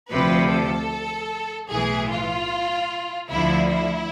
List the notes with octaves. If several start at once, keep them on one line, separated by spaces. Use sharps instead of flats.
D2 C3 F3 B4
A4
B1 A2 E3 G#4
F4
D2 D3 F3 E4
E4